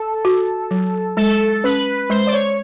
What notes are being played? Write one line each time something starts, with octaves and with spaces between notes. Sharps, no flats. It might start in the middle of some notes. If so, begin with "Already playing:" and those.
Already playing: A4
F#4
F#3
G#3 A4
C#4 B4
G#3 C5
D5
C#5